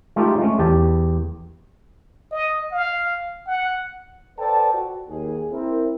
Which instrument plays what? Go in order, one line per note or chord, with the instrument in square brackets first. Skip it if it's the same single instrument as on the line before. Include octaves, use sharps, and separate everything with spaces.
[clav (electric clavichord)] G#3 A3 D#4 F4 G4 A4
G#3 A3 C#4
E2 G4 A5
[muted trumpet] D#5
F5
F#5
[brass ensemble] A4 B4 C5 D5 G5 A5
F#4
D#2 G#4
C4 E4 A#4